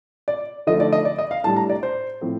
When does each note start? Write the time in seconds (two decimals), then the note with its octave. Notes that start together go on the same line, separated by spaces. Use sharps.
0.28 D5
0.67 D3 F3 A3 D#4 D#5
0.80 D5
0.93 D#5
1.05 D5
1.19 D#5
1.31 F5
1.44 A2 G3 D4 A5
1.56 A#5
1.70 D5
1.83 C5
2.21 A2 F3 C4